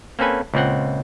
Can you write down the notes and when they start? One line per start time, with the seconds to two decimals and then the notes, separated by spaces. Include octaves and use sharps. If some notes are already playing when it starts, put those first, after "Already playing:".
0.19 A#3 C4 C#4 A4 B4 G#5
0.54 C#2 A#2 C4 F#5